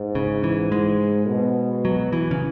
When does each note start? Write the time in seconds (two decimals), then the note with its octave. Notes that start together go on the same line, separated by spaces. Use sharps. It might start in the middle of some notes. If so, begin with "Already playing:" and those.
Already playing: G#2
0.15 C#3
0.44 E3
0.72 G#3
1.28 B2
1.85 F#3
2.13 E3
2.31 C#3